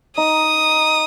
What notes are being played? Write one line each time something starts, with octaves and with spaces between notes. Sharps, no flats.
D#4 D#6